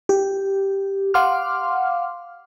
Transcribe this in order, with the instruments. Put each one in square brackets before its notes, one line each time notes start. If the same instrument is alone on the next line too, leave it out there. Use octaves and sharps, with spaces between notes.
[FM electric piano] G4
F5 F#5 C6 D6 F6